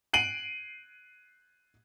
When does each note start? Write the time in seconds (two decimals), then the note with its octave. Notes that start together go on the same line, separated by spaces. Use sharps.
0.13 C7 D7 D#7 F#7